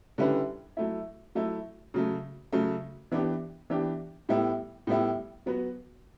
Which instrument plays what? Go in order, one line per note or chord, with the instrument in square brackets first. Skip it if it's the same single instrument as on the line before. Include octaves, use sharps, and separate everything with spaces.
[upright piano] D3 G3 C#4 E4 B4
F#3 A3 E4
F#3 A3 E4
C#3 F#3 A3
C#3 F#3 A3
E3 B3 D4 G4
E3 B3 D4 G4
A2 G3 B3 E4
A2 G3 B3 E4
F#3 B3 F#4 B4